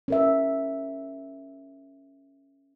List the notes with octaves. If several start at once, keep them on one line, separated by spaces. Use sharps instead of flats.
C#4 A#4 E5